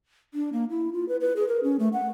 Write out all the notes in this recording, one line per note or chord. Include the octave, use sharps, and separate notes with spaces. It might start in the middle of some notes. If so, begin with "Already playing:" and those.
D4
A#3
E4
F4
B4
B4
G#4
A#4
C#4
A3
F#5